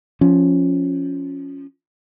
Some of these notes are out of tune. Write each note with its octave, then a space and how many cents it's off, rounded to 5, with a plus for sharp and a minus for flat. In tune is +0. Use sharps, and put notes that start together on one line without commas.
F3 +0 C#4 +0